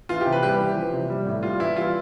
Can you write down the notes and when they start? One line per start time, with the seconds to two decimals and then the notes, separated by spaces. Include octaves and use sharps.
0.09 E3 F4
0.21 G4
0.26 C3
0.32 B4
0.43 G3 G4
0.60 E3
0.76 F3
0.93 C3
1.10 G3
1.27 A2
1.43 G3 F4
1.59 E3 E4
1.76 G3 F4